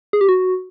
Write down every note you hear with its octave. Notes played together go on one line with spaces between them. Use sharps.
G#4
G4
F#4